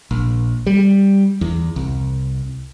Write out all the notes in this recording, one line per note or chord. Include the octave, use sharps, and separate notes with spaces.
A#1
G3
E2
C2